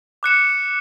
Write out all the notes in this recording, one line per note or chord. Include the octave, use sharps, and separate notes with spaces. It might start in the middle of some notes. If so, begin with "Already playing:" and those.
D6 F#6 C#7 E7